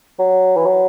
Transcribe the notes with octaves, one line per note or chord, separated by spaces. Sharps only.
F#3
E3
F#3